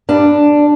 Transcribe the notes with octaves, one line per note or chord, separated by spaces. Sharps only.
G2 D4